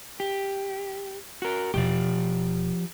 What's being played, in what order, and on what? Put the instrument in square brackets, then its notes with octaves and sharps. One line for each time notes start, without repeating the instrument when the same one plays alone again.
[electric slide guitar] G4
F#4 A#4
[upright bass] E1 [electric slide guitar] F3 G4